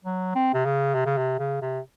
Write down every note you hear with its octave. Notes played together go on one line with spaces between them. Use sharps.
F#3
C4
C3
C#3
C3
C#3
C3
C#3
C3